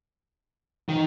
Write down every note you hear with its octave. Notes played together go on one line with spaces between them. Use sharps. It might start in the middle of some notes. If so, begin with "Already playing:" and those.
D#3